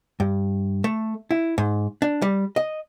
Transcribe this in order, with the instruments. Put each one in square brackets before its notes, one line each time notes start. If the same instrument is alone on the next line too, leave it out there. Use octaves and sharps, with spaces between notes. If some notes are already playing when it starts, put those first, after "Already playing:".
[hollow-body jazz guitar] G2
A3
E4
G#2
D4
G3
D#5